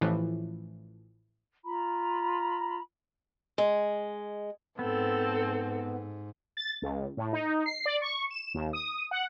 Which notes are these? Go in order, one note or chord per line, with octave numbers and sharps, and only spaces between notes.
A1 A2 E3 F3
F4 A#5 B5
G#3
G#2 B3 C4 A4
A6
C#2
A2
D#4
C7
D5
C#6
E7
D#2
D#6
F#5